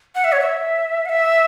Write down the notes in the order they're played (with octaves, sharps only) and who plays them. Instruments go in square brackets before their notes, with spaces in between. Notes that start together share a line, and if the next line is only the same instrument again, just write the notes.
[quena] F#5
E5
C#5
E5
F#5
E5